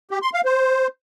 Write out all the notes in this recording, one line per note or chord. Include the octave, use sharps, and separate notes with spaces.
G4
C6
F5
C5